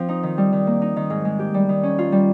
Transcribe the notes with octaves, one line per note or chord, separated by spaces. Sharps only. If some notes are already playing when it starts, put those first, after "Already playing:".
Already playing: F3 C4
D#4
D#3
G3
D#3
A#3
D#4
D#3
G#2
G#3
G4
G3
D#3
C#4
F4
G3